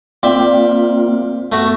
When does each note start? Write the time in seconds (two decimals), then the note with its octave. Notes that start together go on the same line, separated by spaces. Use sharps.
0.23 A#3 C4 F4 D5 E5 G5
1.52 A3 B3 F#4